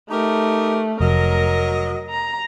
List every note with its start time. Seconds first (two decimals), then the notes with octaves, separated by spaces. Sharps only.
0.11 A3 D#4 G4 A#4
1.01 F1 F#3 A#4 D#5
2.10 A#5